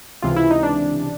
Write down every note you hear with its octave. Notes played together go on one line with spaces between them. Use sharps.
C#2 C3 E3 F4
E4
D#4
D4